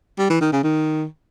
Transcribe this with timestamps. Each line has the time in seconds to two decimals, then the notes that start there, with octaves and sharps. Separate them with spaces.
0.18 G3
0.30 E3
0.41 D#3
0.52 C#3
0.64 D#3